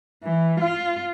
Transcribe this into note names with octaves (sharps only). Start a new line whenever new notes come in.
E3
F4